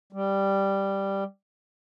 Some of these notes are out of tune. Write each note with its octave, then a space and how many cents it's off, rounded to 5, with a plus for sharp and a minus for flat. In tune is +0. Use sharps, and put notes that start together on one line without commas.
G3 +0